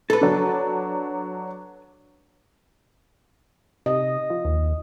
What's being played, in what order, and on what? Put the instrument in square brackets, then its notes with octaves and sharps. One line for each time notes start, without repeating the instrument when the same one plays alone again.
[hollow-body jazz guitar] A4 B4
[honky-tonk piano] F#3 D4
[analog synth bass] C3 [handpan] D#5
[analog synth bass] F3
D#2